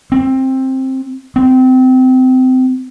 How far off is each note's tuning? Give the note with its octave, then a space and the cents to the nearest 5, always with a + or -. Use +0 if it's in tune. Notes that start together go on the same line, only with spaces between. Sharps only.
C4 +15
C4 -25